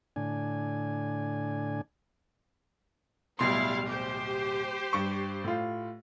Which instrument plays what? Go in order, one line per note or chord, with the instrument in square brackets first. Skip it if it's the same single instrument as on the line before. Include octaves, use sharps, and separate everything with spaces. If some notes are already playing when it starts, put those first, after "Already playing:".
[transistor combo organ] A2 D3 D4 G#5
[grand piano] D1 B2 C6 [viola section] G3 E4 F5
[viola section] G4 C5
[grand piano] G2 C#6
A2 F4